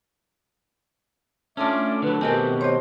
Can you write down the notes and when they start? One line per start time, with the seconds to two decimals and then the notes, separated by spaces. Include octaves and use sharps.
1.57 A2 C#4 D4 F4 A4 E5 D6
2.02 D3 F#3 B4
2.21 B2 D#3 C4 G4 A#4 B4 D#5 G#5
2.61 C5 C#5 D#5